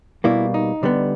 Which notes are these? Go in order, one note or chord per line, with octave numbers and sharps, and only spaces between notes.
B2 G3 A#3 E4
D#4
D3 G3 B3